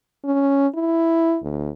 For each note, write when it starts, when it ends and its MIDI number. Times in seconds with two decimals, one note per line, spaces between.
0.25 0.67 61
0.74 1.38 64
1.43 1.69 38